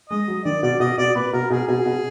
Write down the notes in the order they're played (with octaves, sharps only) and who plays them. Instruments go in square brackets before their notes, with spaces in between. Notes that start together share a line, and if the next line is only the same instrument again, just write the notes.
[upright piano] G#3 [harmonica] D#5
[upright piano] F#3
[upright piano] D#3 [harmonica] D5
[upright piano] B2 [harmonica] D5
[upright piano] B2 [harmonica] D#5
[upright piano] B2 [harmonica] D5
[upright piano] A#2 [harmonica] B4
[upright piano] B2 [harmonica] A#4
[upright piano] B2 [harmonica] G#4
[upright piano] B2 [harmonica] G#4
[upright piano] B2